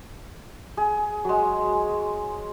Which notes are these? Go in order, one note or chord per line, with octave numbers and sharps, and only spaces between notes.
G#4
F#3 G#3